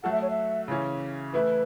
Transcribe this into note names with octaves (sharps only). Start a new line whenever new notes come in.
F#3 A3 F#4 A4 F#5
E5
C#5
E5
C#3 E3 C#4
E3 A3 E4 B4